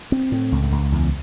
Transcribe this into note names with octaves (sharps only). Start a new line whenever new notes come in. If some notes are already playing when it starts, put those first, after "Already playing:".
C4
A2
C#2
C#2
E2